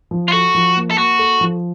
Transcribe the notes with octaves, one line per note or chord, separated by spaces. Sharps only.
F3
F4
F#4 A4
F3
A#3
A4
A#3 F#4
A4
F3